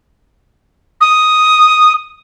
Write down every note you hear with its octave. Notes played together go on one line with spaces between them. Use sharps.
D#6